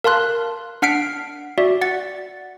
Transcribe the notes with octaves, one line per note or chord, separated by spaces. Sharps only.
A#4 F5 A5 C6 F#6
D4 F#5 F6 B6 C7 D7
F#4 D5 E5
F#5 A6